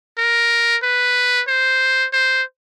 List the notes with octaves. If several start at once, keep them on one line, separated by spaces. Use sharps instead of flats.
A#4
B4
C5
C5